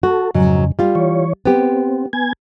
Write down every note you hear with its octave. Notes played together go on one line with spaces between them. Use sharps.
F#4 A4
F2 G#2 C#3 F#3
G3 F4
E3 C#5
B3 C4 G4
B3 G#5 G#6